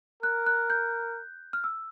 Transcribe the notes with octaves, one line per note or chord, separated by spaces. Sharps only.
A#4 F#6
F#6
G6
F6
E6